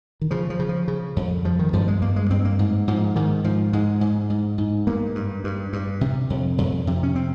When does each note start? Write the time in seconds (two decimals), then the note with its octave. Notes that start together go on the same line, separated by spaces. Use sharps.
0.21 D#3
0.31 C#3 F3
0.50 F3
0.59 C#3
0.69 F3
0.88 C#3
1.16 F2
1.44 G2 F3
1.59 D#3
1.73 G2 F3
1.88 G#3
2.02 G2 A#3
2.16 G#3
2.30 G2 C4
2.45 A#3
2.59 G#2
2.88 G#2 F3
3.16 G#2 D#3
3.44 G#2 F3
3.73 G#2 G#3
4.01 G#2
4.30 G#2
4.58 G#2
4.87 G2 A#3
5.15 G2
5.44 G2
5.73 G2
6.01 C3
6.30 F2
6.58 F2
6.87 C3
7.03 C#4
7.16 C4